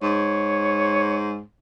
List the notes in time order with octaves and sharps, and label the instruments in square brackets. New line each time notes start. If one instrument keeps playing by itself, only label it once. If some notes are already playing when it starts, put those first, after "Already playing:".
[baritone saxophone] G#2 [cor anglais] C#5